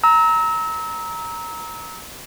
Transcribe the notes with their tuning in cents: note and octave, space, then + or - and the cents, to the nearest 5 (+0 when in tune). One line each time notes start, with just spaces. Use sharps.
A#5 +0 E6 -30